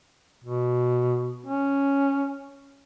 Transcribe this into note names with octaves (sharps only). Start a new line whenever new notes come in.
B2
C#4